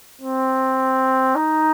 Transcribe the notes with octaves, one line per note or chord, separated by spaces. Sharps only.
C4
D#4